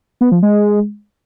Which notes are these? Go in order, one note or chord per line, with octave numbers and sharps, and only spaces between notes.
B3
F3
G#3